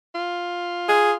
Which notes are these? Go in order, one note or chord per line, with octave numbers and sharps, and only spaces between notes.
F4
G#4